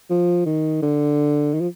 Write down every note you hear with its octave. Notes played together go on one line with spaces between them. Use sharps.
F3
D#3
D3
D#3
F3